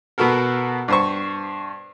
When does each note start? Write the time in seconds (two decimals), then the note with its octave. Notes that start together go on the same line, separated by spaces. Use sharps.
0.18 B2 B3 F#4 A4 A#4
0.88 G2 C5 C#6